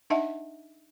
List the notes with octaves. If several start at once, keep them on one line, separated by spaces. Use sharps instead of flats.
D4 D#4 D#5 E5 F#5 A5